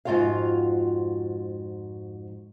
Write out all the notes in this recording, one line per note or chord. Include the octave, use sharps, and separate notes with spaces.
F2 G#2 E3 F4 F#4 F5